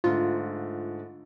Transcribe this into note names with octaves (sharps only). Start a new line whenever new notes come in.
G#2 D3 A3 F4